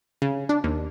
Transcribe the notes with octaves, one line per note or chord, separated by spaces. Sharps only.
C#3
D4
D#2